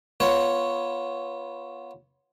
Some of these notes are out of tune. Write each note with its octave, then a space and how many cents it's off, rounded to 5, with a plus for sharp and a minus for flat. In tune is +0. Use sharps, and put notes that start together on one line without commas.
B3 -15 F4 +0 C#5 +5